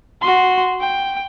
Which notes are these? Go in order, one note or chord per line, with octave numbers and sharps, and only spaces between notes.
F#4 C6
G5